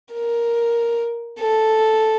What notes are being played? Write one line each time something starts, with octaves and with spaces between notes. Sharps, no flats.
A#4
A4